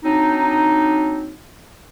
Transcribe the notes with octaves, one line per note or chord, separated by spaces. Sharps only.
F#3 C4 D4 D#4